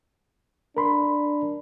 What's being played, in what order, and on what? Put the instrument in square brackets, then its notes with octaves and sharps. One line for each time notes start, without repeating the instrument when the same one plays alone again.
[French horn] D4 [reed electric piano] A#4 B5 C6